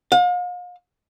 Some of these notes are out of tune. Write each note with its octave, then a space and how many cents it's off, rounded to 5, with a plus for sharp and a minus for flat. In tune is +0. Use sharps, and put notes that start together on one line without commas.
F5 +40